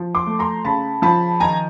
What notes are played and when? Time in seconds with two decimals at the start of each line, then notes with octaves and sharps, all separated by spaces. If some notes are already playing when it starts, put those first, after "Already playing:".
Already playing: F3
0.15 C6 D6
0.27 A3
0.39 A#5 C6
0.65 C#3 A5 B5
1.02 F3 A5 B5
1.40 D#3 G#5 A#5